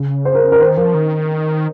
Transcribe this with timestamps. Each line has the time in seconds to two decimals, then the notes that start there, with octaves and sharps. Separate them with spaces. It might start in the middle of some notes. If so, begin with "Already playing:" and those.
Already playing: C#3
0.25 C5
0.35 A#4
0.52 A#4
0.60 D#3 C5
0.77 F3 A#4
0.95 D#3